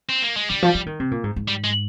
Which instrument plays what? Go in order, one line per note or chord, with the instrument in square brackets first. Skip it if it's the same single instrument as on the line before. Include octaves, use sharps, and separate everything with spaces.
[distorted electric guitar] C4
A#3
G#3
[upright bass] D3 [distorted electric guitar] G3
[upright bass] F3
F3
D#3
C3
A#2
G#2
G#2
[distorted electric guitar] G3
G#3